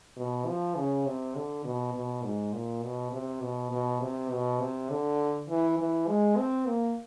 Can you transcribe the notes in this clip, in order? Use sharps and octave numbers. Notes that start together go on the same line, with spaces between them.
B2
F3
C#3
C3
D3
B2
B2
G#2
A#2
B2
C3
B2
B2
C3
B2
C3
D3
E3
E3
G#3
C4
A#3